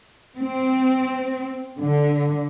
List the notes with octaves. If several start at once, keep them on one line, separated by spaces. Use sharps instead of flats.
C4
D3